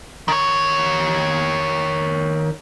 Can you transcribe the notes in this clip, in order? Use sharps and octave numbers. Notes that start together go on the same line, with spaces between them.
D#3 C#5